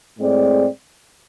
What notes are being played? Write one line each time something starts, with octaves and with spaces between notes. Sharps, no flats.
A2 G#3 C4 G#4 D5